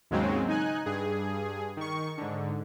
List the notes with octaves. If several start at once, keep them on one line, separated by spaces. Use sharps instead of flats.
D#2 G#2 C#3 F#3 G#3 C4
D#4 G#5 F#6
G2 G#4
D#3 C#6
G#2 D3